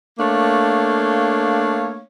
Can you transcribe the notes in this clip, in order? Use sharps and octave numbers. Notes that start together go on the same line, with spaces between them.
A3 A#3 D4 C#5 F5